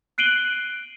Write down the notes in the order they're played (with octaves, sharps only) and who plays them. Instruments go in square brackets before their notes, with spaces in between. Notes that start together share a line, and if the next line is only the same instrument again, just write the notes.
[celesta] F#6 C7 D7 D#7 F#7 G7